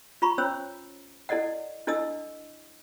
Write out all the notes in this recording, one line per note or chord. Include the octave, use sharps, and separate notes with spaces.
F4 A#5 B5 C#6
C#4 C5 C#5 E6
E4 A4 D5 D#5 F#5
D4 E4 A4 D#5 D#6 E6